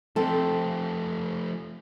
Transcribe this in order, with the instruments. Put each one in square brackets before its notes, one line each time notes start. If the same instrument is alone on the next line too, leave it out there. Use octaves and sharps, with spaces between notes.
[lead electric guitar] F3 A3 [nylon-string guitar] C4 A4